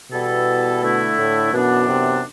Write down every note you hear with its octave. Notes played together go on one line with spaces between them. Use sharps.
B2 E3 G3 B3 E4 A4
D3 A3 E4
A2
F#2 B2 E3 B3 D4
C3